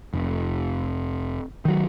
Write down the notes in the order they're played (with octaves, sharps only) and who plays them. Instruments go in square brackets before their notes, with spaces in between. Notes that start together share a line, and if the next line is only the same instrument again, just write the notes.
[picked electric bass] F1
D#3 F#3